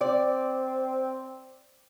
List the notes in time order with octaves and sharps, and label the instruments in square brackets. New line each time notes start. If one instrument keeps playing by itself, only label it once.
[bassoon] C4 [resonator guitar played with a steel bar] D5